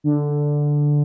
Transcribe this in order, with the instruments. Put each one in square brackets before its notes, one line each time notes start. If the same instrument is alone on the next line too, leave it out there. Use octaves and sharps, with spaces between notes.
[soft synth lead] D3